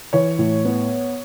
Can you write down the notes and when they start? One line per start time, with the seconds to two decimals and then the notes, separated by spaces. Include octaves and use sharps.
0.13 E3 C#5
0.38 A2
0.65 B3